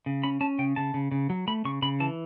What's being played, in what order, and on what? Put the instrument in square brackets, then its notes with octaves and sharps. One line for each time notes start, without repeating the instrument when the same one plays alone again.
[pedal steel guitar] C#3
C#4 B5
C#4 A5
C#3 G5
C#3 A5
C#3
C#3
F#3
A3 B5
C#3 C#6
C#3 B5
E3 A5